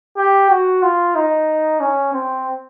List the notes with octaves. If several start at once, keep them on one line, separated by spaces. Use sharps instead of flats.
G4
F#4
F4
D#4
C#4
C4